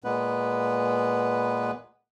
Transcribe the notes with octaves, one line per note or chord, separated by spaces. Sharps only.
A#2 G#3 B3 B4